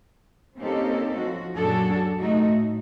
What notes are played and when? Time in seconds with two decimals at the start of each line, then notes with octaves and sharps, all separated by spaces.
0.58 A#3 C4 C#4 D#4 G4 A4
1.16 F3 F#4
1.55 F#2 A#2 D4 F#4 G#4 A4
2.18 C3 A3 D#4 F#4
2.46 A2